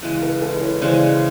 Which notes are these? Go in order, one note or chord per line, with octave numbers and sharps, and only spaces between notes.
C#3 E3 G#3
A4 B4
A4 B4
B4 C#5
C#3 E3 G#3 C5 D5